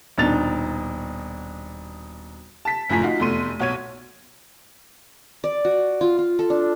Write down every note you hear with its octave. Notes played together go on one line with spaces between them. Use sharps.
D#1 B2 D4 D#4 A6 F7
A5 B6
F#1 A2 F3 G#5 A#5 B6
D#4 F4 F#4
F1 E2 A3 C6 D#7
B1 F#4 C#5 G#6 D#7
D5
F#4
F4
F4
A4
D4